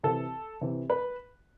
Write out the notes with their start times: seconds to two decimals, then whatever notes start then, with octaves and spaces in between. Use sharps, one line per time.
0.03 C3 E3 A4
0.61 C3 E3
0.90 B4